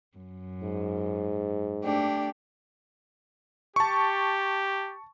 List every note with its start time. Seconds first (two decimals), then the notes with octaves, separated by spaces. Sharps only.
0.17 F#2
0.63 G#2
1.84 A3 D4 G4
3.76 G4 A5 C#6